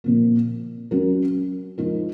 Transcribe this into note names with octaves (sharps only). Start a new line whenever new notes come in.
A#2 F3 A#3
F#3 C#4 F#4 A#4
F3 G#3 D#4 A#4